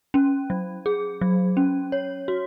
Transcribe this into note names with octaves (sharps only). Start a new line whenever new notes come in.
C#4
F#3
G#4
F#3
C#4
C#5
F#4